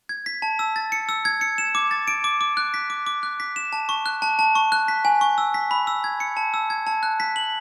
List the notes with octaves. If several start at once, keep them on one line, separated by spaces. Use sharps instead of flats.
G#6
B6
A5
E6
A6
C#7
E6
G#6
C#7
E7
D6
A6
D7
D6
D6
F#6
B6
D6
D6
F#6
B6
E7
A5
C#6
F#6
A5
A5
C#6
F#6
B6
G#5
C#6
E6
B6
B5
E6
G#6
C#7
A5
E6
G#6
A5
F#6
B6
F#7